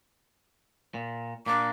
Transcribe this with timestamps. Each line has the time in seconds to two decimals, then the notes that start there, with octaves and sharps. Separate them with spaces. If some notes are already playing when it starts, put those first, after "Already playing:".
0.94 A#2
1.46 A#2 A#3 D4 D6